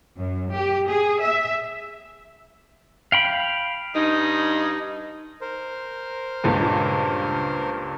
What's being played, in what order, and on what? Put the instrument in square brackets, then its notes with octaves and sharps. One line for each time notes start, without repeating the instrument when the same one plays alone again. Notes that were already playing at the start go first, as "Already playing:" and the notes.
[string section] F#2
G4
G#4
E5
[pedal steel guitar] F5 G5 B5
[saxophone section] G2 D#4
[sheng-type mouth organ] A#4 C5
[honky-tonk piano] C#2 G2 A#2